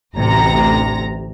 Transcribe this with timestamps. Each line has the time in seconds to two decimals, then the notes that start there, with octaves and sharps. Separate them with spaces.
0.17 A1 D2 C3 A#5 A#6